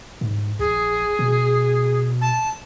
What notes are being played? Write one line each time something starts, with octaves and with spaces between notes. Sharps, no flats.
G#2
A#1 G#4
B2
A5